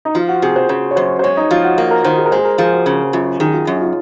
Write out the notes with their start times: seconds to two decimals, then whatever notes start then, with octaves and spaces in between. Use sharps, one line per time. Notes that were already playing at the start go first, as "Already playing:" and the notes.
0.05 D#4
0.15 F3 F4
0.28 F#4
0.42 C3 G#4
0.56 C5
0.69 C#3 C5
0.91 C#5
0.96 F#2 C5
1.19 C5
1.23 G#3 C#5
1.37 D#4
1.51 F3 F4
1.64 F#4
1.78 A#3
1.91 A#4
2.04 D#3 C5
2.18 G#4
2.26 A#4
2.32 G#3 C5
2.39 G#4
2.45 A#4
2.58 F3 G#4
2.72 F#4
2.86 C#3
3.13 F#2 F4
3.40 D#3 G#4
3.53 F4
3.67 F#2 C#5
3.76 D#4
3.81 F4